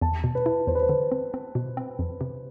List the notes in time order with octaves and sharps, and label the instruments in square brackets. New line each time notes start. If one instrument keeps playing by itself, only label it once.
[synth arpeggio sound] E2 [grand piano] A5
[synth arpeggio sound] B2
[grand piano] B4
[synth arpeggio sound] E4
[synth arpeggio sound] E2 [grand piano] C5
[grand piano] B4
C5
[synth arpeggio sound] D3
C4
C4
B2
C4
F2
C3